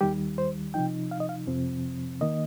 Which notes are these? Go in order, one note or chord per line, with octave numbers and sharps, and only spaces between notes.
D#2 D#3 G3 G4
C5
C3 F3 D#4 G5
F5
D#5
F5
F2 C3 F3 C4
D#3 A#3 D#5